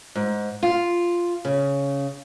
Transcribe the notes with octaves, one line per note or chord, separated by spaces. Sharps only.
G#2
F4
C#3